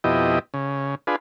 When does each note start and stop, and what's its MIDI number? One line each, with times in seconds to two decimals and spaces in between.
0.04 0.39 41
0.04 0.39 47
0.04 0.39 64
0.04 0.39 67
0.04 0.39 75
0.54 0.95 49
1.07 1.16 62
1.07 1.16 65
1.07 1.16 68
1.07 1.16 71